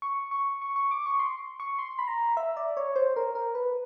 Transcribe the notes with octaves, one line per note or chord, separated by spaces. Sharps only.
C#6
C#6
C#6
C#6
D6
C#6
C6
C#6
C6
B5
A#5
E5
D5
C#5
C5
A#4
A#4
B4